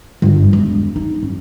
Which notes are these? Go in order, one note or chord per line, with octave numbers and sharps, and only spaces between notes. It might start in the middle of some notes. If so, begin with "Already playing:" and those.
G1 G2
E1
D#4
F#2